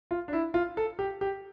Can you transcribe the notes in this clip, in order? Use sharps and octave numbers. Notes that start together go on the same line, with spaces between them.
F4
D4
E4
F4
A4
G4
G4